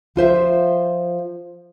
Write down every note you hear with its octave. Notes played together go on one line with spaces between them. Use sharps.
F3 F4 C5 E5